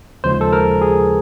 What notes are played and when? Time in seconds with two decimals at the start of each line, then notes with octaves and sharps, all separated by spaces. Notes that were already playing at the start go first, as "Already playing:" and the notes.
0.24 D#2 C#3 F3 G#3 C5
0.41 A4
0.53 A#4
0.81 G#4